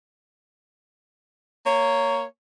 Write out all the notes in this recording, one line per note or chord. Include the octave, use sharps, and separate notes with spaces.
A#3 C#5